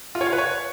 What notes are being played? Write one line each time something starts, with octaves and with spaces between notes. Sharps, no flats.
F4
C#5
F5
B4
C#5